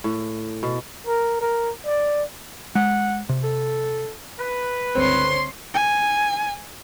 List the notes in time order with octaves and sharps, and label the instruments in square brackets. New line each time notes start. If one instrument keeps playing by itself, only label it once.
[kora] A2
B2
[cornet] A#4
A#4
D5
[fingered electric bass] G#3 [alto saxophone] F#5
[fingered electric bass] C3
[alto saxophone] A4
[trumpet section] B4
[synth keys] G1 C#2 D3 [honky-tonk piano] C4 [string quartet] C#5 C6
[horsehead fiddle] G#5